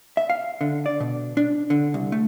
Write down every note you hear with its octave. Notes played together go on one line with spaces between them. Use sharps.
E5
F5
D3
D5
B2
D4
D3
C2
A3